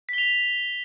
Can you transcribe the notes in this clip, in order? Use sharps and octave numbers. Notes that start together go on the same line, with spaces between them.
B6 F7 G7